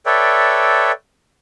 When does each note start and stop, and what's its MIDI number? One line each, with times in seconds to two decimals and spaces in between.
0.06 0.92 69
0.06 0.92 71
0.06 0.92 73
0.06 0.92 74
0.06 0.92 76
0.06 0.92 79